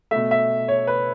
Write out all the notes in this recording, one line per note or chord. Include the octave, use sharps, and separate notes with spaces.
B2 A3 E5
E5
C#5
B4